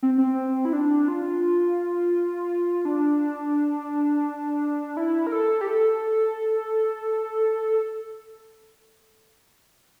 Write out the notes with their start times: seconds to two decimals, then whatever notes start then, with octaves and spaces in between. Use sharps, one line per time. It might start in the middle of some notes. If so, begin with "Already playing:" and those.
0.03 C4
0.18 C4
0.65 E4
0.73 D4
1.08 F4
2.85 D4
4.97 E4
5.27 A#4
5.32 A4
5.61 G4
5.67 A4